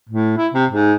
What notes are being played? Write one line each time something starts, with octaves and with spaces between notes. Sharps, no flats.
A2
E4
C3
G#2